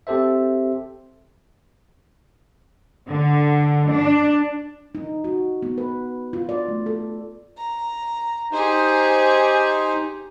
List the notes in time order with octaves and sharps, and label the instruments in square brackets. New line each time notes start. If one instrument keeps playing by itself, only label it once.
[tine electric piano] C4 G4 A4 C5 E5
[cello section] D3
D4
[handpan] D#4
F#4
B3
B4
F4
D5
A3
A4
[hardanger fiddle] A#5
[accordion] D#4 C5 [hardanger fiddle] G4 G#4